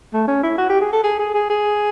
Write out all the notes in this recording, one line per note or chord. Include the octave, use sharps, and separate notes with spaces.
A3
C#4
E4
F#4
G4
G#4
A4
G#4
G#4
G#4
G#4